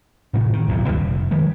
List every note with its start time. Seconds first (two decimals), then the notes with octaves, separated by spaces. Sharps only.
0.34 A2 C3 E3 A3
0.53 D#3
0.68 D1 B1 G2 A#2
0.88 D2 G2 A#2 D#3
1.04 F1
1.31 D#3 F3 G3 G#3